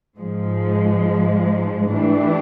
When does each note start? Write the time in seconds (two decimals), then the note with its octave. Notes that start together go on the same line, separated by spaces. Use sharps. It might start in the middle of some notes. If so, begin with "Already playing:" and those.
0.20 G#2 F3 G#3
1.95 E3 A3 D4 G4